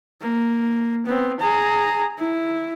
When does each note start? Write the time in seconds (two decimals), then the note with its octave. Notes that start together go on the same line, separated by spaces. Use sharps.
0.22 A#3
1.06 B3 C4
1.40 G#4 A#5
2.18 E4